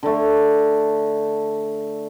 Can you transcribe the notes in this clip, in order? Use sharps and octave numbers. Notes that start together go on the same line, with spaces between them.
D3 A3